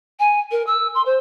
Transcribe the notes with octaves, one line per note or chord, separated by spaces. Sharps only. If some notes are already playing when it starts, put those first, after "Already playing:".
G#5
A#4
E6
C6
C5